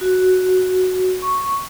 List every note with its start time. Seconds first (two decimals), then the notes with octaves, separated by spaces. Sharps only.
0.01 F#4
1.22 C#6